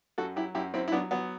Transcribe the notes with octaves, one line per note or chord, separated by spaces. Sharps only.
F#2 F#4 A4
F#3 E4 G4
F#2 E4 G4
F#2 C4 E4
E4
F#3 B3 D4
F#3 B3